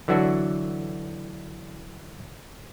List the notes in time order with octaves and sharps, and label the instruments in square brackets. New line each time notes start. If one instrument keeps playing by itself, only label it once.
[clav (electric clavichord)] D3 E3 F#3 D4 F#4